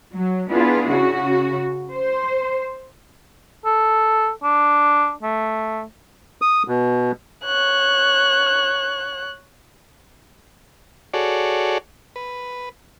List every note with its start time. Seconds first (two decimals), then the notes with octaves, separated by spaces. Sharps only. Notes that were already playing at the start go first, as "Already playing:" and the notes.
0.15 F#3
0.50 B3 D4 E4 F4 G#4
0.91 C#3 F#4
1.94 C5
3.65 A4
4.43 D4
5.23 A3
6.41 D#6
6.68 B2
7.45 C#5 F#6
11.14 F#4 G#4 A4 C#5 D5
12.16 B4